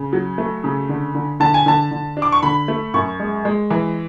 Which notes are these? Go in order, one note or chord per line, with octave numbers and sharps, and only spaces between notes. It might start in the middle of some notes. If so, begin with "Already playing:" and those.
Already playing: C#3
F#3
A3
C#3
D3
D3
D3 A5
G#5
D3 A5
D3
D4
D6
C#6
D3 B5
A3
F#2 C#6
G#3
G#3
E3